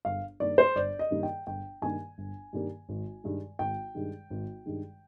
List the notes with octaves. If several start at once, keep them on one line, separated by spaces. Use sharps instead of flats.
G1 F5
G2 D#3 G3 A#3 D5
C5
G1 D5
D#5
G2 D#3 G3 A#3
G5
G1 G5
G2 D#3 G3 A#3 G#5
G1
G2 D#3 G3 A#3
G#1
G2 D#3 G#3
G#1 G5
G2 D#3 G#3
G#1
G2 D#3 G#3